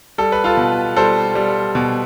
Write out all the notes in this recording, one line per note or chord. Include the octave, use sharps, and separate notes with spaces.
G3 A4
B4
F4 A4
B2
G3 A4 C5
G3
B2